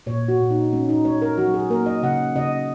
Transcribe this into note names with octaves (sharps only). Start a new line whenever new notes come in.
A#2 C#5
F#4
A#2
D#4
G#3 C#4
D#4
G#3 C#5
A#4
F#3 F#4
G#4
A#3 A#4
D#5
C#3 F#5
C#3 D#5